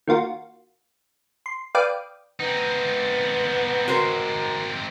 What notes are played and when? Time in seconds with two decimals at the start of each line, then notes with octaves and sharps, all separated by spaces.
0.07 D#3 A#3 F4 F#4
1.46 C6
1.75 B4 D5 F5 G5 D6 D#6
2.40 B3 C4 D#4
3.88 F#4 A#4 C5